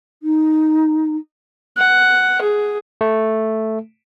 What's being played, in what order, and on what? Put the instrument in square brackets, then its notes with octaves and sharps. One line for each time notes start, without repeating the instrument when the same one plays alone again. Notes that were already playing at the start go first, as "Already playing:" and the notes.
[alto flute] D#4
[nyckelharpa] F#5
G#4
[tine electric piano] A3